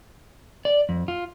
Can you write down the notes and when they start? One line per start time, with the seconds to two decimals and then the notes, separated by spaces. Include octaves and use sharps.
0.65 D5
0.89 F2
1.08 F4